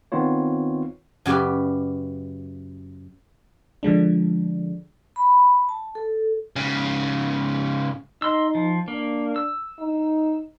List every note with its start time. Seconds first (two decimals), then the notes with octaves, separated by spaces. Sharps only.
0.12 D#3 B3 C4 D#4 F4 C#5
1.26 F#2 C#3 G4 B4 D5
3.83 D3 F3 G#3 D4
5.16 B5
5.69 A5
5.95 A4
6.56 G#2 C#3
8.22 D#4 D#5 C6 E6
8.55 F3
8.88 A#3 D4
9.36 E6
9.80 D#4